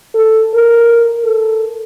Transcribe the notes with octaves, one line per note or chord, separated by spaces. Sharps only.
A4
A#4
A4